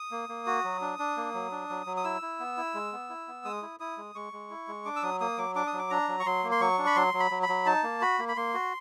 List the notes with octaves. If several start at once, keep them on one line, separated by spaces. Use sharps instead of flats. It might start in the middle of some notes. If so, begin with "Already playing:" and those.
Already playing: D#6
A#3
A#3
F#4
F#3
D4
D4
A#3
F#3
D4
F#3
F#3
D#6
E4 E6
E4
B3
E4
G#3
B3
E4
B3
G#3 D#6
E4
E4 D#6
G#3
G#3 C#6
G#3
E4
G#3
D4 D6
E6
F#3 D#6
A#3 D#6
F#3 D6
D4 D6
D#6
F#3
D6
D4 A#5
F#3
C#6
F#3 C6
A#3
C6
F#3 C#6
D4
B5
F#3 C6
F#3
B5
F#3
B5
F#3
D#4 A5
A#3
F#4 B5
A#3
B5
A#3 C6
F#4